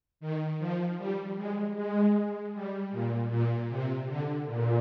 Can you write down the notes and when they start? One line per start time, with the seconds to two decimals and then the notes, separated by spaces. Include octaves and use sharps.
0.20 D#3
0.59 F3
0.98 G3
1.36 G#3
1.76 G#3
2.53 G3
2.91 A#2
3.30 A#2
3.69 C3
4.08 D3
4.47 A#2